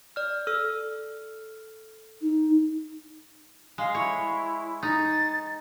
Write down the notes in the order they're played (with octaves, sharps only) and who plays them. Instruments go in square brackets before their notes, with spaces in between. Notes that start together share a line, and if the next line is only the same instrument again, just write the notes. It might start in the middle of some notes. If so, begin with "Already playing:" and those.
[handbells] D5 F6
A4 E6 F6
[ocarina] D#4
[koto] G#3 [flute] F5
[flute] E4 [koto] C#5
[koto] D#4 [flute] A6